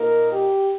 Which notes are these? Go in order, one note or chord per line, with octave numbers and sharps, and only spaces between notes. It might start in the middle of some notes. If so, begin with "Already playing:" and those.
Already playing: A#2 A#3 D#4 A#4
G4